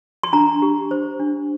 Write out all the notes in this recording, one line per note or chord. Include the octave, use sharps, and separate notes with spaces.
C6
D4 A#5
G4
C5
D4